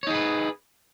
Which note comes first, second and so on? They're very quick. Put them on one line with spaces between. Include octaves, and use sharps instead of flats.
C#5 D#4 G#4 B4